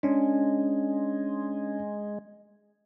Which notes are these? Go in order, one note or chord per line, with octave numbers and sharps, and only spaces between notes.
G#3 C#4 D4